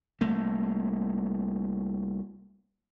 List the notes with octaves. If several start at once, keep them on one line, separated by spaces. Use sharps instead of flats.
C2 A3 A#3